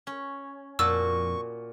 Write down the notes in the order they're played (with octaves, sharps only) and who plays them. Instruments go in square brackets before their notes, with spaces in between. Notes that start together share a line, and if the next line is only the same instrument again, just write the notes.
[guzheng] C#4
[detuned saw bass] F2 [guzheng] A#2 F#4 A5 [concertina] C#6 [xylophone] E6